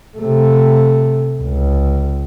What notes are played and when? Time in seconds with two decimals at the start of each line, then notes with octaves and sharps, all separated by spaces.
0.17 C3 A3
1.42 C#2